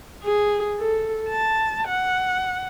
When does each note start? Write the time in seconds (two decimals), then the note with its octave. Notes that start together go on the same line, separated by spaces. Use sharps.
0.24 G#4
0.79 A4
1.29 A5
1.88 F#5